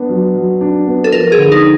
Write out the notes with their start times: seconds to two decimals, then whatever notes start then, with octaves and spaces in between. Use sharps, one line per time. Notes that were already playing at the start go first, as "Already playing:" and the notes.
Already playing: B3 D4
0.09 F#3
0.35 F#3
0.61 D4
0.87 B3
1.04 A4
1.12 F3 A#4
1.32 G#4
1.38 D3
1.52 D#4